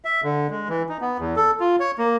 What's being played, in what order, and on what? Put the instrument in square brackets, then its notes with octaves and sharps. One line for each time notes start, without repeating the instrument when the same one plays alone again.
[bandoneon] E5
D3
G#3
E3
D#4
B3
E2
A4
F4
C#5
A#3